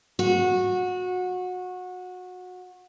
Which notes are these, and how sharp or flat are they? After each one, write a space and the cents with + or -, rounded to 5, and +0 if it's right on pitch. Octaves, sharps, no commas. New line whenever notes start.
F#4 -20